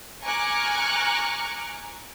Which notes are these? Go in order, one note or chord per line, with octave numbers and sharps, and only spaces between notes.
G#5 A#5 C#6 D6 F6 F#6